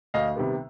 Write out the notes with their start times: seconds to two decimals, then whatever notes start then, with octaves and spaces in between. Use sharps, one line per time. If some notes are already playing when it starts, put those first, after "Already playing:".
0.14 D2 D#5 F5
0.35 C3 D#3 G3 B3